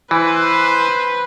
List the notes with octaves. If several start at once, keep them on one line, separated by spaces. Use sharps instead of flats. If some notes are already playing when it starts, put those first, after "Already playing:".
E3 B4 C5